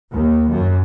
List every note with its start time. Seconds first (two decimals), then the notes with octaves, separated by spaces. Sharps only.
0.12 D#2
0.51 F#2